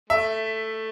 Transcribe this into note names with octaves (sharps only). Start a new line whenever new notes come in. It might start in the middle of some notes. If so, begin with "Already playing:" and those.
A3 E5